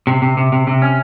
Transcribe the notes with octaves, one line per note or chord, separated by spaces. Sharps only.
C3
C3
C3
C3
C3
C#4